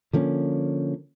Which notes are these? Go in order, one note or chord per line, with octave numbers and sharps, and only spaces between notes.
D3 F3 A#3 C#4